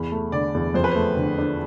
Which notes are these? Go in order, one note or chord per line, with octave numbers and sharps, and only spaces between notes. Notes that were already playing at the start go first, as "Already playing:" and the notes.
Already playing: E2 B5
A3
D3 D5
E2
F2 C5
B4
A3 C5
D3
D4